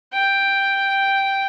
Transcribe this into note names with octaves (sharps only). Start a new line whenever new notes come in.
G5